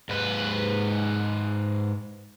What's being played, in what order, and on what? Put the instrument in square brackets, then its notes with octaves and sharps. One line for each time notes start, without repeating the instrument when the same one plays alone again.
[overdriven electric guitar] G#2 B4